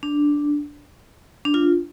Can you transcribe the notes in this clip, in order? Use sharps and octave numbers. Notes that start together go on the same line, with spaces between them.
D4
D4
F4